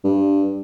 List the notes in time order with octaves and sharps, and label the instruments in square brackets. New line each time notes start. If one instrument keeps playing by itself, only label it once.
[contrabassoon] G2